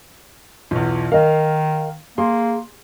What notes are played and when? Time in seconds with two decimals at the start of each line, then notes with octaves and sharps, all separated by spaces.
0.71 B1 E2 F4
1.12 D#3 A#4 D#5 F5
2.18 A#3 G#4 C6